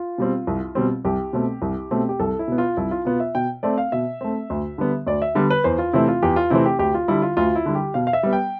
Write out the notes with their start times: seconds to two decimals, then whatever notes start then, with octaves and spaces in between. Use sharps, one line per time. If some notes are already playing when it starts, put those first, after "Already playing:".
Already playing: F4
0.18 B2 G3 C4
0.47 C2
0.75 B2 G3 C4
1.05 C2 G4
1.33 B2 A3 C4
1.62 C2
1.91 B2 A3 C4
2.09 G4
2.19 C2 A4
2.39 E4
2.48 B2 B3
2.58 F4
2.77 C2 E4
2.91 F4
3.05 B2 B3 F4
3.20 E5
3.35 B2 G5
3.63 A3 C4 D5
3.78 F5
3.92 B2 E5
4.21 A3 C4
4.50 D2
4.78 D3 G3 B3
5.07 D2 D5
5.22 E5
5.35 D3 G3 B3
5.50 B4
5.64 E2 C5
5.78 F4
5.93 C3 E3 A3 C4 E4
6.08 F4
6.23 E2 G4
6.36 F4
6.50 C3 E3 A3 C4 E4
6.66 G4
6.79 D2 G4
6.94 F4
7.08 D3 G3 E4
7.22 F4
7.37 D2 F4
7.55 E4
7.66 D3 G3
7.75 G4
7.94 B2 F5
8.07 F5
8.13 E5
8.23 G3 B3
8.33 G5